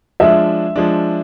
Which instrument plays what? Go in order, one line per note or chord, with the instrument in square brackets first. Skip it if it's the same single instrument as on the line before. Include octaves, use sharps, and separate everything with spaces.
[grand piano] F3 G#3 D4 [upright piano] E5
[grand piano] F3 G#3 D4